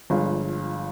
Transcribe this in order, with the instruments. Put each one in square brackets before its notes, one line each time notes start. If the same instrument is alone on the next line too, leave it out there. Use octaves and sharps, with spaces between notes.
[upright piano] G1 G2 F3 G#3